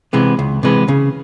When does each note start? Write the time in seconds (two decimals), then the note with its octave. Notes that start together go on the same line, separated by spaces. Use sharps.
0.13 C3 E3 G#3 B3
0.39 C#2
0.63 C3 E3 G#3 B3
0.88 C#3